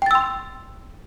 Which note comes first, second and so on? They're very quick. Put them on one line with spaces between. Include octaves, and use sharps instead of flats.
G5 A6 E6 C6